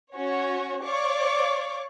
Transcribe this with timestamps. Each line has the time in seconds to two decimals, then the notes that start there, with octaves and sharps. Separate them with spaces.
0.15 C#4 F#4 C#5
0.84 C#5 D5 F5 C#6 D6